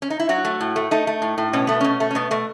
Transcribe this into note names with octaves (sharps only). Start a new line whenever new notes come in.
C#4
D#4
E4
F#3 F#4
A3
A2
A3
A3 D#4
A3
A2
A2
B2 C#4
A3 B3
B2 C#4
A3
C#4
B2 B3
B2 A3